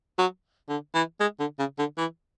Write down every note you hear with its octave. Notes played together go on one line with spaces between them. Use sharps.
F#3
D3
E3
G#3
D3
C#3
D3
E3